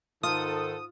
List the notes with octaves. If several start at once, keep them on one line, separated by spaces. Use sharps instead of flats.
G#2 D#3 F4 A4 D#6